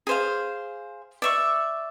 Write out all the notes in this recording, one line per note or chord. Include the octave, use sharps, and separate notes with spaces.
G#4 C5 F5
D5 E5 C#6